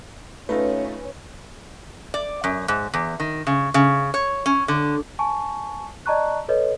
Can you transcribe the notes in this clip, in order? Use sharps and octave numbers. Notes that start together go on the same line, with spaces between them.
A3 C#4 D#4 F4 B4
D5
F#2
G#2
E2
D#3
C#3
C#3
C#5
C#4
D3
G#5 A5 C#6
D5 D#5 A5 A#5 C#6 F#6
A4 B4 C#5 D#5